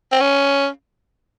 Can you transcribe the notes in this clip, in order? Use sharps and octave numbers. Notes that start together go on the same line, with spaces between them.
C4
C#4